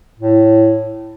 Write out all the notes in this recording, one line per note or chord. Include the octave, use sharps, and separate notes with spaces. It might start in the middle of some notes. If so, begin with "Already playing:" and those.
A2